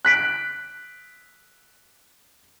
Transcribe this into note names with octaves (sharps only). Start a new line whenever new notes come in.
F#6 B6 D7